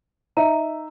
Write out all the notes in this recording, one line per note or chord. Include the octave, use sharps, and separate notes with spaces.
D#4 E5 A#5